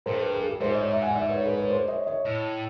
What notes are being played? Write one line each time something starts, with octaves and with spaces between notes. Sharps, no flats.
G2 A#4 C5
A4 B4
G#4 A#4
G4 A4
G#2 C5 D5
C#5 D#5
D5 E5
F#5 G#5
D5 E5
B4 C#5
A4 B4
B4 C#5
C5 D5
C#5 D#5
C#5 D#5
A2